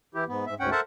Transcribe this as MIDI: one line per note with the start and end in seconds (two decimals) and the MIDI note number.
0.15 0.24 52
0.15 0.24 64
0.15 0.24 67
0.28 0.45 44
0.28 0.45 59
0.46 0.54 44
0.46 0.54 76
0.60 0.70 38
0.60 0.70 44
0.60 0.70 61
0.60 0.70 78
0.60 0.70 79
0.71 0.80 69
0.71 0.80 70
0.71 0.80 72
0.71 0.80 76
0.71 0.80 78
0.71 0.80 81